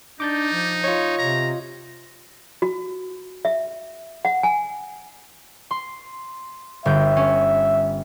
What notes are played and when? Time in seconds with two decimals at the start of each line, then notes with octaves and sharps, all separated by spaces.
0.20 D4 D#4 D6 G6 A6
0.52 F3
0.84 F4 C#5 D#5
1.18 C3 A#5
2.62 F#4
3.45 E5
4.25 F#5
4.43 G#5
5.71 C6
6.85 G1 E5 G6
7.17 C#4